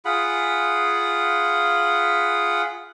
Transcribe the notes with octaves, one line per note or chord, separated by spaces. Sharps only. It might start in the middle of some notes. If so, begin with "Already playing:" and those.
F4 G#4 F#5 B5